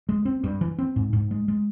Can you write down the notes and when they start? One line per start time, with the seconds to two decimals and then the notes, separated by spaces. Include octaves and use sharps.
0.09 G#3
0.25 C4
0.44 G2
0.61 E3
0.79 C4
0.96 G#2
1.13 G#2
1.31 G#3
1.48 G#3